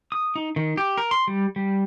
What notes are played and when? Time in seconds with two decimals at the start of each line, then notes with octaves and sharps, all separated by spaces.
0.12 D#6
0.36 D#4
0.56 D#3
0.77 G4
0.98 A#4
1.11 C6
1.28 G3
1.56 G3